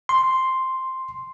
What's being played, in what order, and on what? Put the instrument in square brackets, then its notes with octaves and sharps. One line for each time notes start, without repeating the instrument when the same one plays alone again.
[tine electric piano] C6